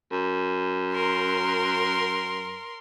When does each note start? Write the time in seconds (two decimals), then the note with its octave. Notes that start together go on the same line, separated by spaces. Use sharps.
0.11 F#2
0.94 A#4 C6